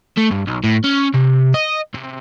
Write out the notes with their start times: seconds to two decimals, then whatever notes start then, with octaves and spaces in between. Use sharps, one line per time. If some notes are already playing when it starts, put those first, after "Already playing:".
0.18 A3
0.31 G2
0.47 B1
0.64 A2
0.84 C#4
1.14 C3
1.54 D#5
1.95 C3